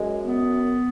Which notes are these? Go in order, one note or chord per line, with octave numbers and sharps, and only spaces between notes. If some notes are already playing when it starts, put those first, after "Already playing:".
Already playing: F#2 G#3
B3